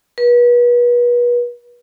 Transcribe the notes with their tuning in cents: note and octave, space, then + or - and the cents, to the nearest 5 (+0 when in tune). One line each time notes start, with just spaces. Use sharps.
B4 -35